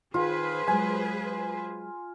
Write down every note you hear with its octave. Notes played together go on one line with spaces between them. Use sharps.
D#3 F4 G#4 B4 C5
F#3 G#3 G#5